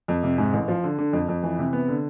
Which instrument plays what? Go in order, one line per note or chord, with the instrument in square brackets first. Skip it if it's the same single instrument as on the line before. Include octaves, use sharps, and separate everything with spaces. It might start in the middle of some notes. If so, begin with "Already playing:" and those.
[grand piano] F2
C3
G#2
A1
F3
D3
D3
F2
F2
E3
C3
B3
D3